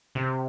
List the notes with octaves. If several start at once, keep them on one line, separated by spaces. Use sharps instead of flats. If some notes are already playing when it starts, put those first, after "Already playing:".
C3